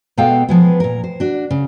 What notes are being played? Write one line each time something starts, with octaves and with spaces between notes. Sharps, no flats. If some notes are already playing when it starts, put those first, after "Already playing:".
B2 G#3 B3 A4 F5 G5
F3 G#3 B3
A#2 A#4
C5
D4 F#4
C#3